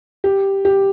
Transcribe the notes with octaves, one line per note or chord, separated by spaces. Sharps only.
G4
G4